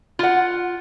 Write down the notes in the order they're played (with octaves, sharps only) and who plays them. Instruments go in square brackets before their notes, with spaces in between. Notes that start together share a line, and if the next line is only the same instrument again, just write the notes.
[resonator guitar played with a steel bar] F4 F#5